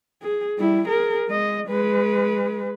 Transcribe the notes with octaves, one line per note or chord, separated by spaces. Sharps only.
G#4
G3 E4
G#4 A#4
G#3 D#5
G#3 B4